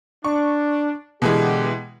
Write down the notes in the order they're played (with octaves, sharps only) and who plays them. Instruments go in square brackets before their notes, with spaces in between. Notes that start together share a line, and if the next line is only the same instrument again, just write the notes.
[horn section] D4 [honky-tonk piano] C#6
[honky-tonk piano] B2 E3 G#3 [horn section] D3 B3 G4